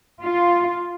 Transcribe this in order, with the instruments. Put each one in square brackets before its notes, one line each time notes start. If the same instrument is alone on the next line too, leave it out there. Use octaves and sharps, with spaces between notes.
[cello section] F4